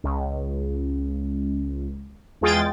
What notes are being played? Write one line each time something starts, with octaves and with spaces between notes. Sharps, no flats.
C#2
E2 G#3 F4 G#4 G5 A6